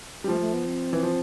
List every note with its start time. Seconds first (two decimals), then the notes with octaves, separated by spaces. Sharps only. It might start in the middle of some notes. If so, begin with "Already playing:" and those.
0.24 G3
0.28 F3 A3
0.41 A3
0.54 B3
0.66 C4
0.93 E3
1.03 F3